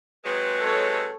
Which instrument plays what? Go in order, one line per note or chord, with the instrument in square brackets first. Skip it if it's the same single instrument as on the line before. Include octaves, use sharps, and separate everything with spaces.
[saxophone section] C3 F#3 G#3 [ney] B4
[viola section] A4 C#5